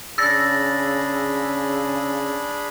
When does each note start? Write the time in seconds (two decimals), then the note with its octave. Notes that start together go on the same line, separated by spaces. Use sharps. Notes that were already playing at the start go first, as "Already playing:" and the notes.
0.18 C#3 D4 G#4 B5 E6 A6 A#6